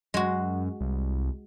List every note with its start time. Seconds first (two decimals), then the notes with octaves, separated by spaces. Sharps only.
0.14 F#2 G#3 F#4
0.80 C2